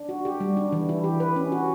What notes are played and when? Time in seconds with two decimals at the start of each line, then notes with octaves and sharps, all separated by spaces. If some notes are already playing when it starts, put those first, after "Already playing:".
Already playing: D4
0.09 F#4
0.25 G4
0.40 G3
0.57 D4
0.72 E3
0.89 E4
1.04 G4
1.20 B4
1.36 C#4
1.52 F#4